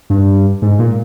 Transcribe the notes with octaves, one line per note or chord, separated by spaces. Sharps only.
G2
G#2
A#2